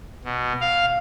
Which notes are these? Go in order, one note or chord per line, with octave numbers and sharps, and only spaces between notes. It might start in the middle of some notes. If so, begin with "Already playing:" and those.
B2
F5